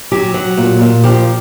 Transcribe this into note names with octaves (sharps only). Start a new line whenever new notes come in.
F#3 G4
F#3
A#2
A#2
F3 G4